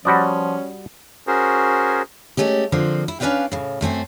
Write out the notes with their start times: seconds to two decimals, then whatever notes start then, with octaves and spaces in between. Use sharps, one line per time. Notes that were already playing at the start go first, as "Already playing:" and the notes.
0.05 F3 G3 C#4 F#4 D5 F#5 B5 D#6
1.27 C#4 F#4 G#4 A#4 C5
2.37 G#3 A3 C#4 G4
2.72 D3 F3 A#3 C4
3.08 E4
3.20 C#4 D4 B4 D5 F5 G5
3.52 A2 C#3
3.81 F#2 A3 C4 G#5